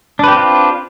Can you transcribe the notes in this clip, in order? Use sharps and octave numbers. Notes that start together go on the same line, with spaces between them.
C4 D4 F4 G4 B4